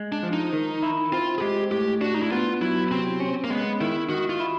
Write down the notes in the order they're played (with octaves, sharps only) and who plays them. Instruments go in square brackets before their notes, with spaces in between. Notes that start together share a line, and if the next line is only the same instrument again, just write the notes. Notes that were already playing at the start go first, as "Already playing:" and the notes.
Already playing: [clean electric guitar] G#3
[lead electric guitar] D4
[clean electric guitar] F3
[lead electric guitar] D#4
[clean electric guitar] D#3
E4
[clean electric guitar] C4 [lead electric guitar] F4
[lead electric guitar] G#4
[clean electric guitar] G#3 [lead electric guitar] G4
[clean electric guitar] A2 [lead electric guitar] G4
[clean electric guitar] D4 [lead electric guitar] F#4
[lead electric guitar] D#4
E4
[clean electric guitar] B3 [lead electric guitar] F4
[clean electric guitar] F#3 [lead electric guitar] E4
[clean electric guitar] C3 [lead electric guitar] C4
[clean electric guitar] C#4
[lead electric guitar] A#3
[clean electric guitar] G#3 [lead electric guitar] B3
[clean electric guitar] D#3 [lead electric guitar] E4
[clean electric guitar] D#3 [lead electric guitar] F#4
[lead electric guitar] F4
[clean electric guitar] E4